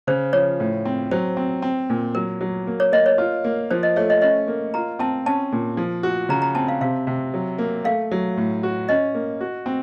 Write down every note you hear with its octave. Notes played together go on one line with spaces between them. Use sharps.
C#3 C5
F3 C#5
A2
C4
F#3 C5
C4
C4
A#2
F#3 A#4
F#3
A#3
C#5
A#3 D#5
C#5
F4
A#3
F3 C5
D#5
A3 C#5
D#5
C#4 D#5
A#3
F4 A#5
C4 A5
C#4 A5
A#2
F3
F#4
C#3 A#5
A#5
C4 A5
F5
C3 F5
C3
F#3
A#3
A3 F5
F#3
A2
F#4
C#4 D#5
A#3
F#4
C4